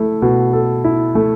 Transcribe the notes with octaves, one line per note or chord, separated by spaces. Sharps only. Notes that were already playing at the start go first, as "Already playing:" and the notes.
Already playing: A3 E4
B2
A4
E4
A3